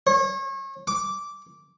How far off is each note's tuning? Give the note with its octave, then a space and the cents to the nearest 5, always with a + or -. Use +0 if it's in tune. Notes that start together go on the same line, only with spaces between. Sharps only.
C#5 -35
D6 -10